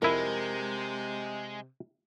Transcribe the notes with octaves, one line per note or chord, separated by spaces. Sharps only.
F2 C3 G#3 E4 A#4